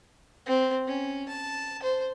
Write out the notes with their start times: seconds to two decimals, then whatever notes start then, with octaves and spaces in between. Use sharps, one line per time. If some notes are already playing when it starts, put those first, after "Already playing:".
0.46 C4
0.87 C#4
1.29 A5
1.82 C5